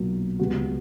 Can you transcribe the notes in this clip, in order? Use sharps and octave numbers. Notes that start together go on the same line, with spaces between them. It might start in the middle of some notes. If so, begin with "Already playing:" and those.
Already playing: B1 A#2 F#3
C#2 C#3 G3 B3 F#4